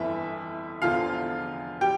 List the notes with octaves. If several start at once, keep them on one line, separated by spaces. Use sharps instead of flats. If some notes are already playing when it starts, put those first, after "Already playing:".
Already playing: G1 F2 E3 E4 E5
F1 E2 D3 F3 F4 F5
G4 G5